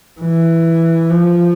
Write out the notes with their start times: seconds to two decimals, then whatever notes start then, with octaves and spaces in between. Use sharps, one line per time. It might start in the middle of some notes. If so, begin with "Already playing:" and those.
0.21 E3
1.10 F3